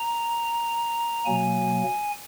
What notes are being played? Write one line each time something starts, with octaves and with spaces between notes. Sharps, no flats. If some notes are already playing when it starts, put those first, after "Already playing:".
Already playing: A#5
B2 F#3 A#3 G#5